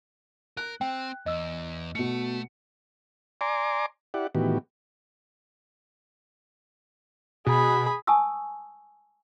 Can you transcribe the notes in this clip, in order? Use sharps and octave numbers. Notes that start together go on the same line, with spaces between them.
A#4 F#6
C4 G5
E2 D#5 E6
B2 A3 C#7
D5 G#5 A#5 C6 D6
E4 G4 D5 F#5
A2 D#3 E3 B3 F#4 G4
B2 G#4 B5
G#5 A5 C#6 D#6 E6